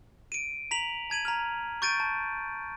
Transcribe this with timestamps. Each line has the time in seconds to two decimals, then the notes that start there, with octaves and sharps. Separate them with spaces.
0.32 D7 D#7
0.71 A#5 B6 F7 F#7
1.10 A5 G#6 D#7 F#7
1.25 A#5 F6
1.82 C#6 G6 A6 D7 D#7
2.00 A5